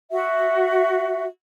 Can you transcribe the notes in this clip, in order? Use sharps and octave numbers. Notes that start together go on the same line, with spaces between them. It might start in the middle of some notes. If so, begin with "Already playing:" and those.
F#4 E5